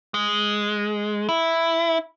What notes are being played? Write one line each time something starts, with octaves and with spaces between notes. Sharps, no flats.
G#3
E4